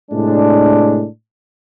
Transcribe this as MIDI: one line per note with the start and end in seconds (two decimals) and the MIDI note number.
0.11 1.05 45
0.11 1.05 48
0.11 1.05 56
0.11 1.05 62